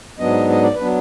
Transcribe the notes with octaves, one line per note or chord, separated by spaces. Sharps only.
G#2 F#3 B3 D4 D#5
D#5
D5
B4
F#3 B3 D4